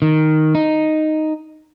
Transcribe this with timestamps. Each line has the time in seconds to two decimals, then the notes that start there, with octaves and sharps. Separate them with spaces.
0.02 D#3
0.55 D#4